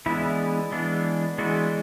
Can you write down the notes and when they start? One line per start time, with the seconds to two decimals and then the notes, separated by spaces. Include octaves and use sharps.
0.06 E3 G#3 B3 D4 E4
0.72 E3 G#3 B3 D4
1.38 E3 G#3 B3 D4 F#4